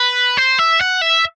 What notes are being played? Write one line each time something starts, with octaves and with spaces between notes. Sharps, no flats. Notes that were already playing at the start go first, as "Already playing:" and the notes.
Already playing: B4
C5
E5
F#5
E5